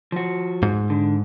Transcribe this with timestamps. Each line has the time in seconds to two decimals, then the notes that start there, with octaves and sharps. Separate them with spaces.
0.12 F3 F#4
0.63 G#2
0.90 D3